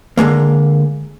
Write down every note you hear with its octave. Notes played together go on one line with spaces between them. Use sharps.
D3 F3 G#3 A#3